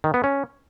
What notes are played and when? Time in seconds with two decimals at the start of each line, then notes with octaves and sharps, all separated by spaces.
0.04 D#3
0.14 B3
0.24 C#4